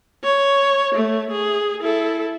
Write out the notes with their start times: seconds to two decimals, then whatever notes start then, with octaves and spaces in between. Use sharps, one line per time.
0.23 C#5
0.95 A3
1.31 G#4
1.82 E4 A4